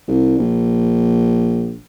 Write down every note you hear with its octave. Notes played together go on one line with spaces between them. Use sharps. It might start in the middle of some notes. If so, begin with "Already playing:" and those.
C2
A#1